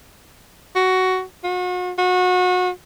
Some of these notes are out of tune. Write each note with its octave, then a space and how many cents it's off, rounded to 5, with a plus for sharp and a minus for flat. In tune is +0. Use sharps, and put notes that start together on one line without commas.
F#4 +10
F#4 -40
F#4 -30